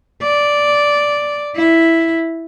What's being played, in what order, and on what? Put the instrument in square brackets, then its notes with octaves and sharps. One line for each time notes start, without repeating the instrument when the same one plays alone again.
[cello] D5
E4